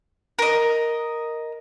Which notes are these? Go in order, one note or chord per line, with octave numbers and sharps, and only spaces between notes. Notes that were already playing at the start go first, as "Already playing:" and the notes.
A#4 D#5